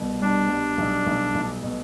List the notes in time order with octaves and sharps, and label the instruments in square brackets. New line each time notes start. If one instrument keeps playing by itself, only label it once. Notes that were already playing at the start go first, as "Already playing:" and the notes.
Already playing: [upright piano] C2 B2
[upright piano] G3 [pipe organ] D4
[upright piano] G3
B1
B1
B1
B2